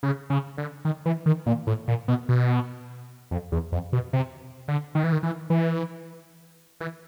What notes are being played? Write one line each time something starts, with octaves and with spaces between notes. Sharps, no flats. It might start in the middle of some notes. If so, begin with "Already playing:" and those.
C#3
C#3
D3
D#3
E3
D#3
A#2
A2
A#2
B2
B2
F2
E2
F2
B2
C3
D3
D#3
E3
D#3
E3
E3
E3